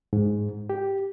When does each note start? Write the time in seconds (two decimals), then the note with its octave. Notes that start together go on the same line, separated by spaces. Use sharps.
0.13 G#2
0.70 G4